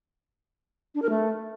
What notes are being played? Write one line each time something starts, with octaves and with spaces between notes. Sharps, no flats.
D4
A#4
A3